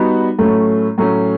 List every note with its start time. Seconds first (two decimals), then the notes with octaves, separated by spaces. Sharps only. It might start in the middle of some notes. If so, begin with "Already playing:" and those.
Already playing: G3 B3 D#4 F#4
0.39 A2 F#3 A3 C#4
0.98 A2 F#3 A3 C#4